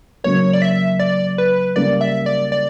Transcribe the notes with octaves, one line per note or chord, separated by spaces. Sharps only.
C#3 F#3 A#3 C#5
D5
E5
D5
B4
C#3 G3 A#3 D5
E5
D5
D5